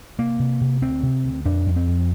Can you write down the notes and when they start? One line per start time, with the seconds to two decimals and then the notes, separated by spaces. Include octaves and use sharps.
0.19 C3 A#3
0.39 C3
0.61 C3
0.82 D2 C4
1.03 C3
1.24 D2
1.45 F2 D4
1.66 F2
1.76 C4
1.87 F2